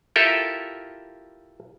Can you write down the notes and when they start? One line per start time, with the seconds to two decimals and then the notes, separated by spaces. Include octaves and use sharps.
0.16 E4 F4 G4 A4 A#4 E5